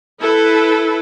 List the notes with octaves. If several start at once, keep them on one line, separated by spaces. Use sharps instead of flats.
E4 A4 B4